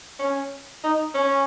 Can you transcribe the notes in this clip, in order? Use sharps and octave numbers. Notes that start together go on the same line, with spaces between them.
C#4
D#4
C#4